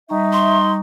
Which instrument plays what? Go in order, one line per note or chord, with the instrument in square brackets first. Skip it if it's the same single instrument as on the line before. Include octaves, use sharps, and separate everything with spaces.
[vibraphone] G3 A#5 C#6 [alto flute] D#4 [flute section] E5
[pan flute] C6